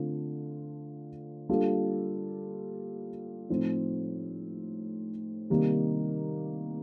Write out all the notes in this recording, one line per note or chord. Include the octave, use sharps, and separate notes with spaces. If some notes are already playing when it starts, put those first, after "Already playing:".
Already playing: D3 A3 C4 F4 A4
G3 A#3 D4 F4 A4
A2 F3 C4 D#4
C3 D#3 G3 A#3